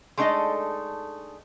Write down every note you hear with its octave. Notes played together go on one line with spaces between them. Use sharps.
G#3 A3 D4 D#4 A4 D#5